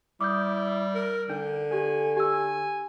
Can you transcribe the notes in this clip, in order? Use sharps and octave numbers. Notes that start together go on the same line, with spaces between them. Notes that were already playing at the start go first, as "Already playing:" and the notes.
G3 E4 D6 D#6 G6
A#4
D3 D4
G4 A4 G#5
G4 G#5 E6